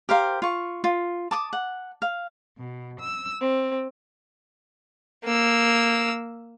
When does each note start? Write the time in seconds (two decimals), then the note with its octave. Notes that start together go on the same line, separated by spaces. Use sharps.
0.09 G4 A#4 C5 F5
0.42 F4 C#6
0.84 F4
1.31 A5 D6 D#6
1.53 F#5
2.02 F5
2.58 B2
3.00 E6
3.41 C4
5.24 A#3 E6